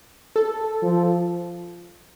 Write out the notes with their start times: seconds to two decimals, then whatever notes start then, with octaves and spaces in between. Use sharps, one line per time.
0.36 A4
0.82 F3